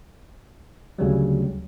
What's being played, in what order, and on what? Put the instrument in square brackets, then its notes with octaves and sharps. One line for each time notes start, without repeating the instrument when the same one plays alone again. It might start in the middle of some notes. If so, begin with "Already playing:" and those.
[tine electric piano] D2 C#3 F#3 G3